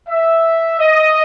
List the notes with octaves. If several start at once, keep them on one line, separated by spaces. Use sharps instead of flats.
E5
D#5